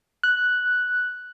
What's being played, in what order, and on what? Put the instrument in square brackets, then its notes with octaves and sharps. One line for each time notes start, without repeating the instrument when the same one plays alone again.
[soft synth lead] F#6